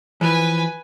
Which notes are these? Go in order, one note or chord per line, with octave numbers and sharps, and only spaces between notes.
E3 F3 B4 G#5